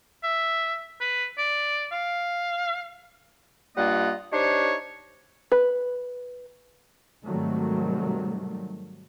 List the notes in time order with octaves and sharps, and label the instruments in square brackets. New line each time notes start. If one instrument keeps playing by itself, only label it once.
[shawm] E5
B4
D5
F5
[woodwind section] G2 G3 A#3 F4 D#5 F#5
D4 D#4 G4 C5 C#5
[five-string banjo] B4
[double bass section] G#2 C3 D#3 F#3 G3 A3